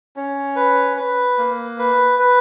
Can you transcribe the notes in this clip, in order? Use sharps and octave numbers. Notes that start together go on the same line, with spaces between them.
C#4
B4
B4
A#3
B4
B4